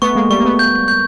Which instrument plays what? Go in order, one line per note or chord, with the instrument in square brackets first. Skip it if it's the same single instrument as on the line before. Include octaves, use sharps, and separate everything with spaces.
[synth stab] A3 B3 [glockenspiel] C#6
[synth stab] G#3 A#3
[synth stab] G3 A3 [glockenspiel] C#6
[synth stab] A#3
A3 B3
[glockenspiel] G6
G6